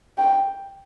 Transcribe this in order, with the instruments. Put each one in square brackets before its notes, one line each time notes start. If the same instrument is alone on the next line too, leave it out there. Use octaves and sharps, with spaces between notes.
[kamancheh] G5